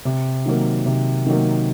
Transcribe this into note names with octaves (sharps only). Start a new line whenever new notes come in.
C3
D#3 F#3 A#3
C3
D#3 F#3 A#3